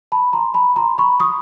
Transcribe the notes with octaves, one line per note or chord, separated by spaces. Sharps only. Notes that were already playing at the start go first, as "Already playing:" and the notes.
A5 B5
A#5 C6
A5 B5
A#5 C6
B5 C#6
C#6 D#6